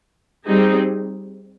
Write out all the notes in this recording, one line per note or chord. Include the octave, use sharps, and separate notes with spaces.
G3 C4 D#4 G#4